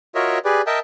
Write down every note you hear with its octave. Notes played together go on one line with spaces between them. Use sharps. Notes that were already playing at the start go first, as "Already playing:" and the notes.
F4 F#4 A#4 C#5 D#5 E5
G4 G#4 B4 D5
A#4 D#5 E5 G5 A5